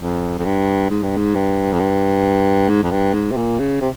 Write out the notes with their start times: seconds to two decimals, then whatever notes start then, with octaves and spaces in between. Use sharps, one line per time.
0.01 F2
0.38 F2
0.45 G2
0.90 G#2
1.03 G2
1.17 G#2
1.35 G2
1.72 F2
1.80 G2
2.69 G#2
2.83 F2
2.91 G2
3.14 G#2
3.32 C3
3.37 A#2
3.59 C#3
3.81 C3